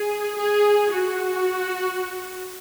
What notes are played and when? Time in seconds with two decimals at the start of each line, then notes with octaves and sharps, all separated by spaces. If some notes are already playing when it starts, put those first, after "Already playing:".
Already playing: G#4
0.38 G#4
0.91 F#4